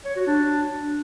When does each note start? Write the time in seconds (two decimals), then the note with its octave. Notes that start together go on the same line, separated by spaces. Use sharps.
0.05 C#5
0.16 F#4
0.27 D4